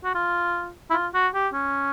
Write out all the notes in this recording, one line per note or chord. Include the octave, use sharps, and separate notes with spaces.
F#4
F4
E4
F4
F#4
G4
C#4